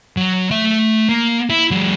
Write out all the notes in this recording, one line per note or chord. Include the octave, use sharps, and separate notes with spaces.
F#3
A3 E5
A#3
E4
F#3 G#3